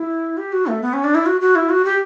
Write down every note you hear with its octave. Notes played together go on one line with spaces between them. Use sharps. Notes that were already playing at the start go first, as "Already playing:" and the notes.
Already playing: E4
G4
F#4
A3
B3
C#4
D4
E4
F#4
F#4
E4
F#4
G4